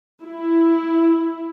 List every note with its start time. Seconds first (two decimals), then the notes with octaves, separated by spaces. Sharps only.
0.24 E4